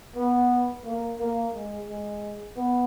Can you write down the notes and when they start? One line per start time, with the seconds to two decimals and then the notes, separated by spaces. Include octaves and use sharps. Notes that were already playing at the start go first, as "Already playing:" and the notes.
0.16 B3
0.85 A#3
1.19 A#3
1.54 G#3
1.88 G#3
2.56 B3